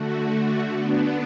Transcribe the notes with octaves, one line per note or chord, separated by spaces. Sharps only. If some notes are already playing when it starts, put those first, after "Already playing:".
Already playing: D3 A3 F#4
D3 B3 D4